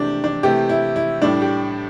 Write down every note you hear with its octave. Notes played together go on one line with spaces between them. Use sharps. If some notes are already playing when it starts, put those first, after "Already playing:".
Already playing: C3 E3 A3 D4 G4
D4
C3 E3 A3 G4
E4
E4
A2 G3 D4
G4